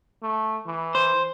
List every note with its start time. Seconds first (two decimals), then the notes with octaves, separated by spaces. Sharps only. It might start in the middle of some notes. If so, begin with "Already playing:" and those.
0.23 A3
0.66 E3
0.95 C5